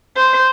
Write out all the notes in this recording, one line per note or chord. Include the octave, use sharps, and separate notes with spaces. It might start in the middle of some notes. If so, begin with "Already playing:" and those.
C5